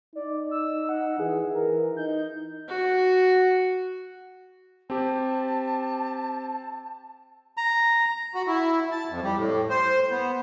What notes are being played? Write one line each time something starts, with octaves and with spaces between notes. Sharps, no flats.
D#4 D5
E6
F#5
E3 G#4
E3 A#4
D#4 G6
F#4
C4 G4 A5
A#5
F#4
E4
A5
F2
G3
A2
C5
B3